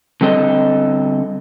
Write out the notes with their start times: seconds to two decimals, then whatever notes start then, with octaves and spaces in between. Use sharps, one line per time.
0.21 D3 G3 C4 A4 D#5